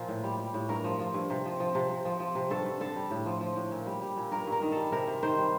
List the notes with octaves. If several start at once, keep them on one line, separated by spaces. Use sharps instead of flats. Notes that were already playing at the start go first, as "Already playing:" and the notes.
Already playing: A#2 F3 F4
A2
G3
G3
A2
G2 A#4
F3
F3
G2
C3
F3
F3
C3
C3
F3
F3
C3
G2 A4
G2
D3 A4
G3
A2
F3
F3
A2
A#2
G3
G3
A#2
G2 A#4
G2
A#4
D#3
G3 A4
C3 A#4
C3
D#3 C5
G3